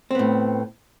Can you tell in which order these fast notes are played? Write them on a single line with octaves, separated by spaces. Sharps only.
C4 B3 A2